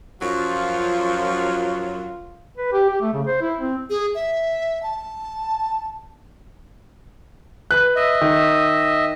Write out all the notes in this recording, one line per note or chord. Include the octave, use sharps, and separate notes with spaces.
F#2 F3 F#3 F4
B4
G4
G4
A3
C#3
C5
E4
C4
G#4
E5
A5
B4 F#6
D#5 E5
D#3